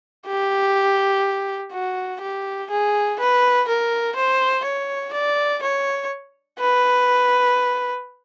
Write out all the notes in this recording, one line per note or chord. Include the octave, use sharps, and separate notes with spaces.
G4
F#4
G4
G#4
B4
A#4
C5
C#5
D5
C#5
B4